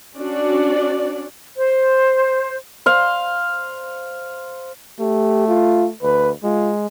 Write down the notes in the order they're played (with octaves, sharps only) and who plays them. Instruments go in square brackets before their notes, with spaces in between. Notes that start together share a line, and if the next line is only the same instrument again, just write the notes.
[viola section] C#4 D4 F#4 D5
[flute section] C5
[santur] C5 F5
[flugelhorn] A3 [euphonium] G4
[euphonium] F4
[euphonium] D2 [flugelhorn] B4
[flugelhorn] G#3 [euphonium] F4